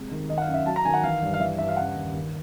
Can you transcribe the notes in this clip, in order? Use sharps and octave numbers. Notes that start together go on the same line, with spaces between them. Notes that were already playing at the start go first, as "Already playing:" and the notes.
Already playing: C3 G#3
D#3
D#3 D#5
F#5
F5
F#2
E5
F#3 A5
A#5
D#3 G#5
F#5
E3 F5
G2
F5
E3 E5
G2 E5
F5
C#3 F#5
D#2
D#3